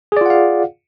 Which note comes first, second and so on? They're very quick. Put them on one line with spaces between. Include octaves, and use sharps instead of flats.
G#4 D5 F4 F#5 F5